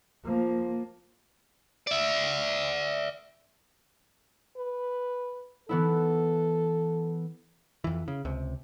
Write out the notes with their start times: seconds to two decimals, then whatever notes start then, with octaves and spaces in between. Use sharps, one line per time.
0.24 F3 A#3
1.87 D5 E5
4.57 B4
5.69 E3 B3 E4 A4
7.84 F2 E3
8.08 C#3
8.25 C#2 C3